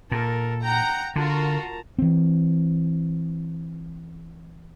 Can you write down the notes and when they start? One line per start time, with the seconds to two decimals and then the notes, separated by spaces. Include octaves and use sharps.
0.12 A#2 A4 A#4
0.63 F#5 G5 A#5
1.16 D3 F4 F#4 A#4 A5 A#5
1.99 E3 C4